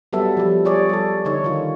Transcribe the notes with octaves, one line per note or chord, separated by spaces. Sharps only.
F#3 G3 B3 A4 E5
F3 G3
G3 G#4 C#5 D5
G3 A4
D3 D#4 C#5
D#3 F4